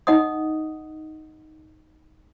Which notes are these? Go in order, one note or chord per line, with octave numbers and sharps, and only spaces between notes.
D#4 D#5 F#5 D#6